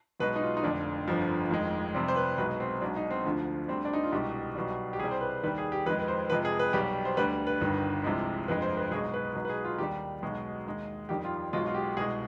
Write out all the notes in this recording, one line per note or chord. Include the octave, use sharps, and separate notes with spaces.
B1 B2 G#3 B4
D#4
F4
D#4
F1 F2 D3 D4
G1 F2 D3 F3
F1 F2 D#3 G#3
F2 C3 G3 C4
C5
B4
B1 B2 G#3 B4
C4
B1 B2 G#3 D4
D#4
C4
D2 D3 F3
D2 D3 G3 C4
D4
D#4
F4
C2 B2 G#3 G4
B1 B2 G3
G4
C2 C3 G3 G#4
C5
B4
D#2 D#3 G3 B4
G#4
G4
F2 D#3 G#3 B4
B4
C5
F2 C3 F3 G#3 B4
G#4
B4
B1 B2 G3 G4
C5
D2 D3 G3 B4
B4
G1 G2 D#3
C2 C3 F3 G#3
G1 F2 D3 G#3 B4
C5
B4
B1 B2 G#3 G#4
B4
B1 B2 G#3 B4
B4
G#4
F4
D#2 D#3 G3 G4
B1 B2 G#3
D#2 D#3 G#3
F2 D#3 G3 G4
F4
B1 B2 G#3 F4
F4
G4
C2 B2 G#3 G#4